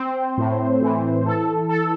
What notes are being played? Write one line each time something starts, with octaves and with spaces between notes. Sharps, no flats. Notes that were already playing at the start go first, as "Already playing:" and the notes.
Already playing: C4 C5
A2
E3
A4
A4